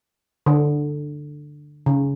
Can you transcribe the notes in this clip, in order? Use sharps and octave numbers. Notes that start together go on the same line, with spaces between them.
D3
C#3